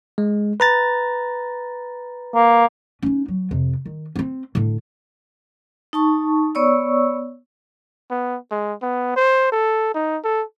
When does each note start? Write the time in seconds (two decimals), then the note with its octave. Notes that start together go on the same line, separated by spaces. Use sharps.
0.18 G#3
0.60 B4 A#5 A6
2.35 A#3
3.02 C#4 D#4
3.28 F#3
3.51 F2 C3
3.86 D#3
4.16 C4 C#4
4.55 A2 D3
5.93 D#4 A5 C#6
6.55 B3 C#5 D5 C#6 E6
8.11 B3
8.51 G#3
8.82 B3
9.16 C5
9.52 A4
9.94 D#4
10.24 A4